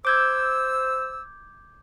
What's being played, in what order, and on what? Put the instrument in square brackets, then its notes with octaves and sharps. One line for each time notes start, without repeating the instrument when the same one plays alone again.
[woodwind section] C5 E6 [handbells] D6 G6 G#6